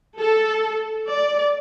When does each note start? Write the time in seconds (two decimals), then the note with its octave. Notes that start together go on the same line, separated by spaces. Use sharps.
0.20 A4
1.10 D5